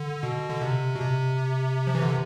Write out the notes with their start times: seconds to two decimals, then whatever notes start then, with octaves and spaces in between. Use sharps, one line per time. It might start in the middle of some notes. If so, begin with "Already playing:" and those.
Already playing: D3
0.23 B2
0.49 D3
0.62 C3
0.96 B2
1.00 C3
1.87 F3
1.95 E3
2.02 D3
2.09 C3